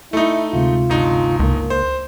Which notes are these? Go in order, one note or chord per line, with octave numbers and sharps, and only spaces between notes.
A3 D#4 E4
D2 C3 G#3 F4
G1 D#4
C#2 A#3
C5